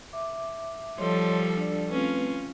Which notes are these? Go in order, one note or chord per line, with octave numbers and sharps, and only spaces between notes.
E5 D6
F3 G3 A4 C#5 D#5 C6
D4 D5
A3 C4 C#4 F4 B4